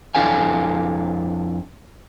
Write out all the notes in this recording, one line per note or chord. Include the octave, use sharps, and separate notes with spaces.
F2 D4 E4 A4 F5 G#5